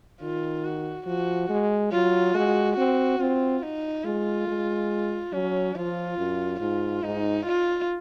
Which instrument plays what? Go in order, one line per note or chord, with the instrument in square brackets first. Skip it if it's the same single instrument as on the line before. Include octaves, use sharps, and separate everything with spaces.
[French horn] D#3 [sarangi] F4
[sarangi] F#4
[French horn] F3 [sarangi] F#4
[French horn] G#3
[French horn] F#3 [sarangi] F4
[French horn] G#3 [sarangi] F#4
[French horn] C4 [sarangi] F#4
[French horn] C4 [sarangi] F4
[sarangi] D#4
[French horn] G#3 [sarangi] F4
[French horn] G#3
[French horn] F#3 [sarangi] C#4
[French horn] F3 [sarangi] F4
[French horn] F#2
[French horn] G#2 [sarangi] F4
[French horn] G#2 [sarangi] D#4
[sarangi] F4